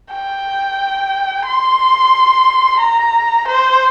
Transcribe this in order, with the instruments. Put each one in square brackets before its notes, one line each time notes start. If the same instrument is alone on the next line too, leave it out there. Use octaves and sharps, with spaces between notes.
[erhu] G5
C6
A#5
C5